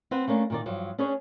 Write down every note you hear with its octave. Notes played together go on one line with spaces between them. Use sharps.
C4 B4 F#5
A3 A#3 C#4 D4
A#2 D#3 D5
G2 F3 F#3
C#4 D4 G#4 B4 C#5